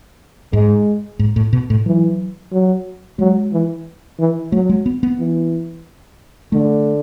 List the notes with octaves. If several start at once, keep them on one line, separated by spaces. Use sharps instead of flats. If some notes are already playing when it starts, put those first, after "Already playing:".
G#2 G#3
G#2
A2
B2
A2
E3 F#3
F#3
F#3 G#3
E3
E3
F#3 A3
G#3
B3
B3
E3
D3 A3